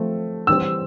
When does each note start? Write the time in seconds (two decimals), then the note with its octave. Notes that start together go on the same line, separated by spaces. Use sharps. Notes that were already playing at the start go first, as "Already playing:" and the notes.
Already playing: F3 A3 C4
0.47 E3 G3 C4 E6